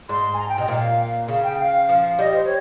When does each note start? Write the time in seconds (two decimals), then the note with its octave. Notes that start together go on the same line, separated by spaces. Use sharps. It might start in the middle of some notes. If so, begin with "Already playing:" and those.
0.08 G#2 C6
0.33 G#5
0.38 A#5
0.49 G5
0.58 C3 D#5
0.68 A#2 F5
1.28 C#3 F5
1.43 G5
1.59 F5
1.89 F3
2.19 G3 D#5
2.34 C5
2.44 C#5